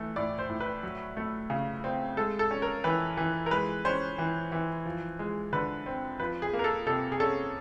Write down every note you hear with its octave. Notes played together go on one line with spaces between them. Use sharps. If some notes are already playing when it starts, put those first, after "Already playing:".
Already playing: E3 A3
A2 D5
C5
A2
B4
F#3
A3
C#3
C4
G#3 A4
A4
C#4
A#4
E3 B4
E3
A#4
G#3 B4
C#4 C5
E3
E3
F3
G#3
D3 B4
C4
F3 B4
G#4
A#3
A#4
A4
C3 A4
G#4
C#4 A4